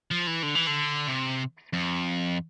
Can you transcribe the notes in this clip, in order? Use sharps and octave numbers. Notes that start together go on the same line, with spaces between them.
F3
E3
D3
E3
D3
C3
F2